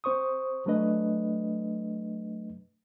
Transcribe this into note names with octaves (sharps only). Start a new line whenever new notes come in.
C4 C5 C#6 D#6
F#3 A3 D4 B4 D#5